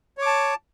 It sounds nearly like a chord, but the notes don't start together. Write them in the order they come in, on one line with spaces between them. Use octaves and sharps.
C#5 D6 A5